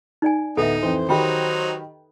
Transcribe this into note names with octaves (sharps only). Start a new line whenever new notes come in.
D#4 D5 G#5
D2 A2 B3 D#4 A4 E5
F2 E3 C5
D#3 F#3 D#4 G4 B4 G5 B5